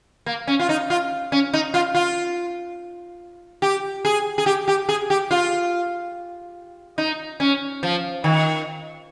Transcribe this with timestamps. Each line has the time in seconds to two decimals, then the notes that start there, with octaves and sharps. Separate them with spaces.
0.26 A#3
0.47 C#4
0.60 F4
0.69 D#4
0.90 F4
1.32 C#4
1.53 D#4
1.74 F4
1.95 F4
3.62 G4
4.05 G#4
4.38 G#4
4.46 G4
4.68 G4
4.89 G#4
5.10 G4
5.31 F4
6.98 D#4
7.40 C#4
7.83 F3
8.24 D#3